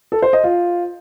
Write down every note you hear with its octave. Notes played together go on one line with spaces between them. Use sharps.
A4
C5
D#5
F4